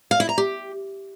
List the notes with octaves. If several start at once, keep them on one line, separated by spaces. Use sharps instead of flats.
F5
E4
A#5
G4